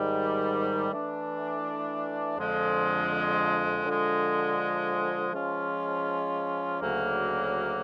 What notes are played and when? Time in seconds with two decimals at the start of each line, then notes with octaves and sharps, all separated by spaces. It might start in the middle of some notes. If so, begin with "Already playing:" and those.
Already playing: G#2 D#3 G3
0.90 E3 A3 D4
2.37 F2 D3 F3 G#3
3.85 D3 F3 G#3
5.33 F3 G#3 C#4 F4
6.80 D2 C#3 F#3 A#3